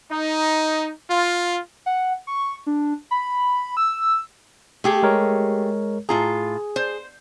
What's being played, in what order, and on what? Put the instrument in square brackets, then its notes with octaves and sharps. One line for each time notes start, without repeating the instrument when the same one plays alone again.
[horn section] D#4
F4
[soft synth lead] F#5
C#6
D4
B5
E6
[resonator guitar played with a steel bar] A3 G4 G#4
[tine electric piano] G#3 A#4 C#5
[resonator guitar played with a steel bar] A2 F4 A#5 [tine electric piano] G#4
[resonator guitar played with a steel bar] C5